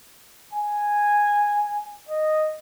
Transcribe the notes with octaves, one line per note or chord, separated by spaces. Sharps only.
G#5
D#5